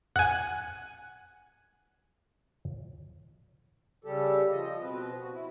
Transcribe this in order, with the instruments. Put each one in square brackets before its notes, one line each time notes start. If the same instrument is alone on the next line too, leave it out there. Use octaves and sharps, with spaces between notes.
[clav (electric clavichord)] F#5 G#5
[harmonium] C#3 G3 G4 A4
F3 D#5
B2 C4 B4
F#4
E4